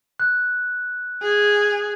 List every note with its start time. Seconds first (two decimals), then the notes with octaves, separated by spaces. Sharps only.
0.20 F#6
1.22 G#4